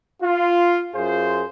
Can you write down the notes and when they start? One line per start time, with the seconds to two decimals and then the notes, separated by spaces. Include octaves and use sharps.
0.22 F4
0.94 F#2 F4 G#4 C5